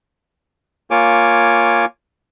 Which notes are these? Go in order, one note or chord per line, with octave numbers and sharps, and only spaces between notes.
A#3 F4 C#5 G#5 D6